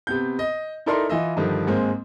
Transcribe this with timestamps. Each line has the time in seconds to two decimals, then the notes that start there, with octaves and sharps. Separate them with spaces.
0.07 C3 B3 G6
0.39 D#5
0.86 D#4 E4 A4 A#4 D5 C6
1.09 E3 F4 D#5 E5
1.37 G2 D3 D#3 F3
1.67 G#2 G#3 A#3 C4